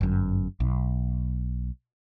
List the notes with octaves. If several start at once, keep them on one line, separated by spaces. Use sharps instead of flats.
G1 F#2
B1